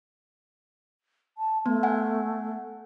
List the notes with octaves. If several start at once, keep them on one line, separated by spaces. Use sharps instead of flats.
A5
A3 B3
F#5 G#5